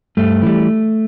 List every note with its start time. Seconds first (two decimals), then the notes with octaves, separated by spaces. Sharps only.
0.17 G2 A3
0.42 E3 G3